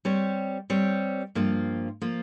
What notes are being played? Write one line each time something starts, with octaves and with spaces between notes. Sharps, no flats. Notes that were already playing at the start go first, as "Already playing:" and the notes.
G3 C4 G4 C#5
G3 C4 G4 C#5
G2 F3 A#3 F4
F3 A#3 F4